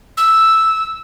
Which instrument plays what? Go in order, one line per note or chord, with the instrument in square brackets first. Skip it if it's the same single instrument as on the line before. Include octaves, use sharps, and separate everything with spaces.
[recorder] E6